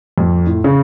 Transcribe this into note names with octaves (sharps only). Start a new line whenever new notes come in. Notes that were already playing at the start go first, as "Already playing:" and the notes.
F2
A2
C#3